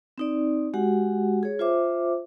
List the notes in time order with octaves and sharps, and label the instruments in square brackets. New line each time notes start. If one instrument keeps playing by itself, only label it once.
[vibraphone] C4 D#4 D5
G#3 F#4 G4 F#5
G#4 C#5
F4 C5 E5 D6